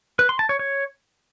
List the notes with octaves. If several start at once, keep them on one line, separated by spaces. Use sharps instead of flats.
B4
C6
A5
C#5
C#5